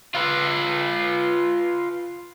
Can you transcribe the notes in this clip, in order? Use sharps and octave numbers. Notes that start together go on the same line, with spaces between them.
F4 B4